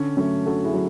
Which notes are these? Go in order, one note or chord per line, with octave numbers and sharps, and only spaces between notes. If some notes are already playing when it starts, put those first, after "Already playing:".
Already playing: D3 C#4
F#3 A3 C#4
D3 F#4 A4
E4 G#4
F#3